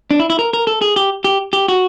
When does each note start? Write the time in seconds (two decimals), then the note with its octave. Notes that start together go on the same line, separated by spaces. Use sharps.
0.11 D4
0.20 E4
0.30 E4
0.39 A#4
0.53 A#4
0.67 A4
0.81 G#4
0.96 G4
1.24 G4
1.53 G4
1.68 F#4